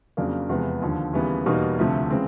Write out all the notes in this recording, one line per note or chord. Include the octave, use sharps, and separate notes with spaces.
F2 C#3 F#3 A#3 D4
E2 C3 F3 G#3 B3
D#2 D3 F3
D#2 C#3 E3 G3 B3
E2 B2 G3 A#3 D#4
D2 C3 F3 A3
C#3 E3 G#3 C4